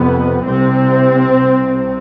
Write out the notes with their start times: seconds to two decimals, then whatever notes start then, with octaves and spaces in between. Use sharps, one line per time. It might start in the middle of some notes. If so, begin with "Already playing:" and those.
Already playing: F2 C3 B3
0.45 C2 C3 C4
1.38 C2 C3